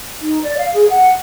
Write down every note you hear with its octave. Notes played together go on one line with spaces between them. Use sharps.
D#4
D5
F5
G#4
F#5